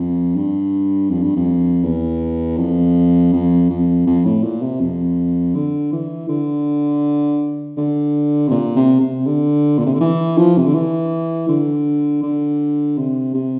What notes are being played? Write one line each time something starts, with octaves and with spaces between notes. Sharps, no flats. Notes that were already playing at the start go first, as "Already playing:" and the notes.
Already playing: F2
G2
F2
G2
F2
E2
F2
F2
F2
F2
A2
A#2
C3
F2
D3
E3
D3
D3
C3
A#2
C3
C3
D3
A#2
C3
D3
E3
F3
C3
D3
E3
D3
D3
C3
C3